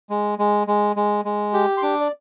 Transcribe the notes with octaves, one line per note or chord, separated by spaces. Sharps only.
G#3
G#3
G#3
G#3
G#3
G4
C6
D4 D6
D5